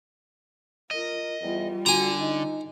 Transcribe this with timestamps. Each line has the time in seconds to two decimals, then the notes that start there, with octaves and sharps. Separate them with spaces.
0.91 F4 A#4 D#5
1.41 E2 G3 F4
1.86 D3 F#4 G#5 A#5
2.20 D#4